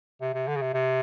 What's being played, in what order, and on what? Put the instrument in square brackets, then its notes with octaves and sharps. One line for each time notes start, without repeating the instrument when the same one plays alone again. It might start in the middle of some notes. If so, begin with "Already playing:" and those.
[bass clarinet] C3
C3
D3
C#3
C3
C3